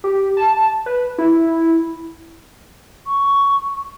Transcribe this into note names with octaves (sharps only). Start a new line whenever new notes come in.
G4
A5
B4
E4
C#6